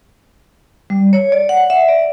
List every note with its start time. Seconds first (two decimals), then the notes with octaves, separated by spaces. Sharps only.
0.90 G3
1.13 C#5
1.32 D5
1.49 F#5
1.70 E5
1.89 D5